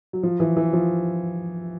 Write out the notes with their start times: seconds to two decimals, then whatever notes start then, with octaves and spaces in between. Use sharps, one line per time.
0.13 F#3
0.23 F3
0.40 E3
0.57 E3
0.73 F3